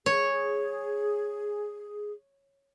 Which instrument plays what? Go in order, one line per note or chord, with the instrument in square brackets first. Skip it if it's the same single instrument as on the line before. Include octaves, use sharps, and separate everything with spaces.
[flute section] G#4 [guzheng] C#5